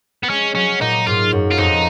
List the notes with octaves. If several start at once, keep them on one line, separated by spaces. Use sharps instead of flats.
B3
G#3 C#4
F#3 C#4
A#2 D#4
G#2 F4
F#2
F4
F2 D#4